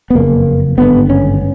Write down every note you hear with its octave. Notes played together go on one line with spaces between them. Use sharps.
B3
F#1 F2 C#3 A#3
G#1 G2 D3 B3
C#4